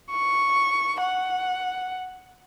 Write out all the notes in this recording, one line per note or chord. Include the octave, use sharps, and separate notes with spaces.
C#6
F#5